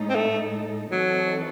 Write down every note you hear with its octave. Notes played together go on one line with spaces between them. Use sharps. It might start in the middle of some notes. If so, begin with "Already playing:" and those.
Already playing: A2 G#3 D#4 A4
C4
A3
E3 F#3 C4 D#4 F#4 A4